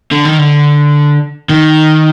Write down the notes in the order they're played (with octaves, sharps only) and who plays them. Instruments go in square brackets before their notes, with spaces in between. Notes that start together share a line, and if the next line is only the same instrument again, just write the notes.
[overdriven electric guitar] D3
D#3
D3
D#3